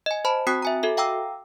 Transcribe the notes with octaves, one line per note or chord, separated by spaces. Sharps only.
D#5 G#5
C5 A5 B5
C4 F#4 G5 D#6 F#6 B6
E5 G#5 A#5
F#4 A4 E5
F5 G5 A#5 D6 E6